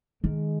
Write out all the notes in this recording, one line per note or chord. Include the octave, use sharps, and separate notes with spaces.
D#3 G#3